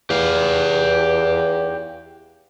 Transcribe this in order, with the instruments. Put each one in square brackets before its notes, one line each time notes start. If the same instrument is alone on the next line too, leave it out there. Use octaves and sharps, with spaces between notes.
[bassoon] E2 [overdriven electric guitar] G4 F5